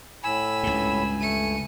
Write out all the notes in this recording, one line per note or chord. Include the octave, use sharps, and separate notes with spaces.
A2 G#5 B5 E6
C#2 G2
A3 C#7 D#7